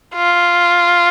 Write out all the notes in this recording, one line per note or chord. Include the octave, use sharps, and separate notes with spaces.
F4